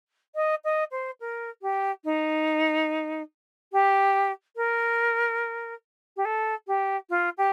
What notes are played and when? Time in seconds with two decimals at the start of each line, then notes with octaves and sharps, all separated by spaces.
0.35 D#5
0.65 D#5
0.91 C5
1.20 A#4
1.62 G4
2.04 D#4
3.73 G4
4.56 A#4
6.17 G4
6.25 A4
6.67 G4
7.10 F4
7.38 G4